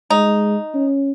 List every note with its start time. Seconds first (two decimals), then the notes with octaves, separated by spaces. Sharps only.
0.10 G#3 D#4
0.74 C#4